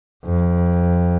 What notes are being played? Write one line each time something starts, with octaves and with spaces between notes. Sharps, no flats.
F2